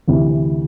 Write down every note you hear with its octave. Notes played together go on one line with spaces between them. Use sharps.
D2 C3 E3